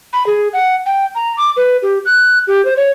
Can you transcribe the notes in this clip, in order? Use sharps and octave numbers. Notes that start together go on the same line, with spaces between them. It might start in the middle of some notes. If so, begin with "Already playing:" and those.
B5
G#4
F#5
G5
A#5
D6
B4
G4
F#6
G4
C5
C#5